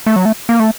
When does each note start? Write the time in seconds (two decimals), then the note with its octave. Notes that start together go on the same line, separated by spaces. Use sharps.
0.07 A3
0.16 F#3
0.25 A3
0.49 A#3
0.60 A3